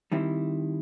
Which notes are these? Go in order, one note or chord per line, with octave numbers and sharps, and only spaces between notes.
D#3 G3 C4 E4